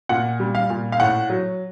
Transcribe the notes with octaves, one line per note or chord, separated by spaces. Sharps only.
A#2 F#5
G3
F5
A#2
F5
A2 F#5
F#3